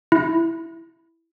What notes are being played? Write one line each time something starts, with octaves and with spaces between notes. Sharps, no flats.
E4